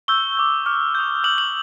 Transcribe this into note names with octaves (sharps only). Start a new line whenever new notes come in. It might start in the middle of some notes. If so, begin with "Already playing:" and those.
C#6 E6 G6 G7
D6 G6
D6 F6
D#6 G6
D6 F6 F#7
F#7